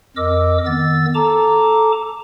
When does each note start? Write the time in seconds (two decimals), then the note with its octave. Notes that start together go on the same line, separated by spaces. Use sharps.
0.17 F2 A#4 D#5 D6 E6
0.66 D#3 B3 E6 A6
1.14 A4 A5 A#5 D6